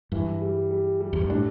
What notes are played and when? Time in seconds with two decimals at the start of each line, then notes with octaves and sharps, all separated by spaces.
0.12 G2 E3
0.42 G3
0.71 G3
1.00 G3
1.13 E2
1.21 G2
1.30 A2 D4